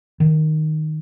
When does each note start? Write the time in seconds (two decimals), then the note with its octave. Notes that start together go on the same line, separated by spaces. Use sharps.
0.20 D#3